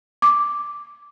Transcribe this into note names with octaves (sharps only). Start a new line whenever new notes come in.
D6